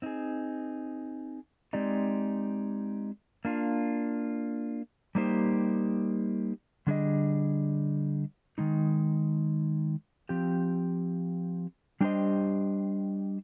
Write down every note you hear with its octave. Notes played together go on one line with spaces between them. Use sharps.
C4 D#4 G#4
G#3 C4 D#4 G4 D5
A#3 D4 F4
G3 A#3 D#4 G4 C5
D3 G3 D4 G#4 D#5
D#3 G#3 D#4
F3 C4 G4
G3 D4 G4 C5 D#5